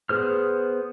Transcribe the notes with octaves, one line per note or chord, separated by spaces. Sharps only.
B3 G#4 C5 F6